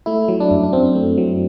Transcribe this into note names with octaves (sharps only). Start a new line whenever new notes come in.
A3 E4
F#3
D4
F#2
D4
F#2 C4
A3
F#3